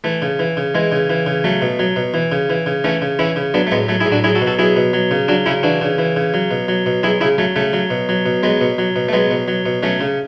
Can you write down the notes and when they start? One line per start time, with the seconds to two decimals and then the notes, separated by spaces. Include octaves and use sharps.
0.04 E3 A3
0.22 C#3
0.39 E3
0.57 C#3
0.75 E3 G#3
0.92 C#3
1.10 E3
1.26 C#3
1.44 F#3 A3
1.62 B2
1.79 F#3
1.96 B2
2.14 E3
2.32 C#3
2.50 E3
2.66 C#3
2.84 E3 A3 C#4
3.02 C#3
3.19 E3 C#4 E4
3.36 C#3
3.54 F#3 B3 D4
3.67 A3
3.71 A2 G#3 B3
3.89 F#3 A3
4.00 E4 G#4
4.06 A2
4.12 D4 F#4
4.24 F#3 E4 G#4
4.35 F#4 A4
4.41 B2
4.47 F#4 A4
4.59 F#3 E4 G#4
4.76 B2
4.93 F#3
5.11 C#3
5.28 F#3 D4 F#4
5.46 C#3 C#4 E4
5.63 E3 D4 F#4
5.81 C#3
5.98 E3
6.16 C#3
6.34 F#3
6.51 B2
6.68 F#3
6.86 B2
7.03 F#3 E4 G#4
7.21 C#3 E4 G#4
7.38 F#3 A3
7.56 C#3 A3
7.73 F#3
7.90 B2
8.09 F#3
8.26 B2
8.43 F#3 G#3 B3
8.61 B2
8.78 F#3
8.96 B2
9.08 A3
9.13 F#3 G#3 B3
9.31 B2
9.48 F#3
9.66 B2
9.83 F#3 A3 C#4
10.01 C#3